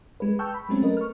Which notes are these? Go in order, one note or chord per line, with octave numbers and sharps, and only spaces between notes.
G#3 B4
G5 A5 C#6 E6 F6 G6
B5
F#3 G#3 A3 C4 C#4
A3 A#4 B4 D#5
C#6 F6